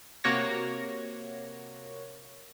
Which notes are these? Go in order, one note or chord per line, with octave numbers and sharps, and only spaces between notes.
C3 A#3 F#4 C#5 A#6